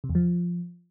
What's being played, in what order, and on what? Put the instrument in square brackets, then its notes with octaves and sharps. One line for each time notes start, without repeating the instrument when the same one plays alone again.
[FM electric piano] C3
E2
F3